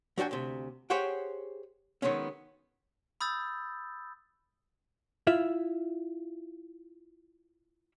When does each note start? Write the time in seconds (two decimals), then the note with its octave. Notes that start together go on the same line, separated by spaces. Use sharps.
0.18 F#3 D4 F#4 G5 G#5
0.31 D2 C3
0.90 G4 G#4 C5 C#5 F#5 G5
2.02 D#3 F#3 G#3 B3 C#4
3.21 B5 D#6 E6 G6 A6
5.27 E4 F4 E5